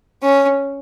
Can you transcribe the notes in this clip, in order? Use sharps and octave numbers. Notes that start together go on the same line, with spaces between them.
C#4